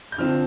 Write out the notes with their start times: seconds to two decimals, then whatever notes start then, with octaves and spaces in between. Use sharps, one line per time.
0.12 G6
0.18 D3 F3 C4 F6